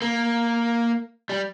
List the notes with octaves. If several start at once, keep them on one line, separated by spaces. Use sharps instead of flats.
A#3
G3